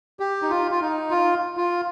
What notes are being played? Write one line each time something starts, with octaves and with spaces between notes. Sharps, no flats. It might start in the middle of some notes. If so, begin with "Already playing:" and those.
G4
D#4
F4
F4
D#4
F4
F4